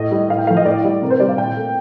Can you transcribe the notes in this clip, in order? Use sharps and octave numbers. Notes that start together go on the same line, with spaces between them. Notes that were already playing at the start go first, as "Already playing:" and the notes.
Already playing: A2 D#5
G3
A2 F5
G5
F3 A3 F5
D#5
A2 D5
G3
C3 A#4
C5
G3 D5
F5
A#2 G5
A3